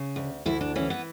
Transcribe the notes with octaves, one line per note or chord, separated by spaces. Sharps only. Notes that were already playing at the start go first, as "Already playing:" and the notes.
Already playing: C#3
D2
D2 E4
D4
E3 C#4
B3